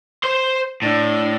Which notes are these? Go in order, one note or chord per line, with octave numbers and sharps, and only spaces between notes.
C5 C6
A2 D4